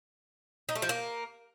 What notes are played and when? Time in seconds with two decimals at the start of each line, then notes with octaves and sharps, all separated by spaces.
0.69 D#4
0.75 A3
0.82 F3
0.89 A#3